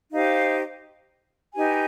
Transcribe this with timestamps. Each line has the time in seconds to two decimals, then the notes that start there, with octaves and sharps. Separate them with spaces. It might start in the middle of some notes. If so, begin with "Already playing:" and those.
0.13 D#4 G4 C5 F5
1.54 D#4 G4 B4 G#5